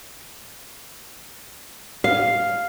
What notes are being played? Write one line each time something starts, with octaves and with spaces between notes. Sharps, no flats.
F5